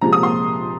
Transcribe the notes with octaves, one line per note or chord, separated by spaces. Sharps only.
C3 F3 G#3 A#5
D#6
C6